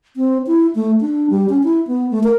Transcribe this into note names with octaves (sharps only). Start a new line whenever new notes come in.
C4
E4
A3
D4
G3
C#4
E4
B3
A3
A#4